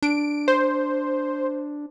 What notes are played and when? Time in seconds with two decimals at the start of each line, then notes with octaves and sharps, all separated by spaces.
0.02 D4 D7
0.48 C5